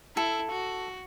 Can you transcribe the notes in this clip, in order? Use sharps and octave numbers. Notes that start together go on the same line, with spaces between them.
E4 A4
F#4